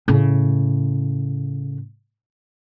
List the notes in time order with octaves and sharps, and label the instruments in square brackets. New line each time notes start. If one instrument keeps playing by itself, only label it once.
[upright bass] A2 C#3